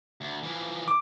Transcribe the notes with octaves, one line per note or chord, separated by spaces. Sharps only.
D2
E3 F3
D6